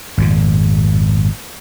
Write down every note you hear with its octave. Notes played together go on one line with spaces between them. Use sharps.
G#1 F2 A#2